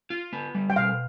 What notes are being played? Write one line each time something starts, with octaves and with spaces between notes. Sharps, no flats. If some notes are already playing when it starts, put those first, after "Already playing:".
F4
B3
G3
G5
B2 F5